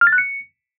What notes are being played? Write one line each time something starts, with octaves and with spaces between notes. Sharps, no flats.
F6
A6
F#6
C#7